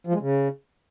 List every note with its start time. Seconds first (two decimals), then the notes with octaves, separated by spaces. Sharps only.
0.07 F3
0.14 G#3
0.21 C#3